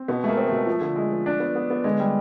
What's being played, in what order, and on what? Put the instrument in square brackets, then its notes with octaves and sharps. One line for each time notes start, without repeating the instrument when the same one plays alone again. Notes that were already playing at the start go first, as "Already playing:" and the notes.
Already playing: [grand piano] C4
[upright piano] B2 [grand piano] B3
[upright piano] G#3 [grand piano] A3
[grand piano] A#3
[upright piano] C4
[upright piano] B2 [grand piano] A3
[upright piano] F3
D3
G#3
F3
D4
B3
B3
B3
[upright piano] D3 [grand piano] G#3
[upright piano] G3